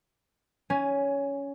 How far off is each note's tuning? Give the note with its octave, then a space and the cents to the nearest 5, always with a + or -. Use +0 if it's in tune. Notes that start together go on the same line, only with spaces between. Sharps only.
C#4 +15 G#5 +0